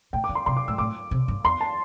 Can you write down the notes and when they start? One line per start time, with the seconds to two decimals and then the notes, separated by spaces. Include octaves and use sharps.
0.13 A2 G5
0.24 D6
0.29 D3
0.35 C6
0.46 C3 C6
0.57 D6
0.68 A2 E6
0.78 A2 D6
1.11 C3
1.28 G2
1.44 E2 C6
1.61 A5